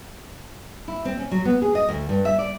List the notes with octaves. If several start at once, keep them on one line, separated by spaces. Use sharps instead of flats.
E4
C4
C#4
F#3
B3
G#4
D#5
D2
G2
E5
D5